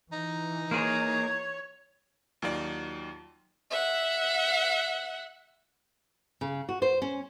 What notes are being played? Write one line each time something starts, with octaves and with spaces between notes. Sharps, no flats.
E3 D#4
A#3 G#4 C#5
D#2 F#3 D#4 F4 D5
E5 F#5
C#3
F#4
C5
C#4